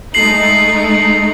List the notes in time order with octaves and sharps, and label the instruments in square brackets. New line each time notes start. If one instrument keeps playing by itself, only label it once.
[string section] G#3 A3 D#4 [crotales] C7 F#7